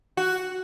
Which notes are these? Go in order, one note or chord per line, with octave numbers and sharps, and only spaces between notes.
F#4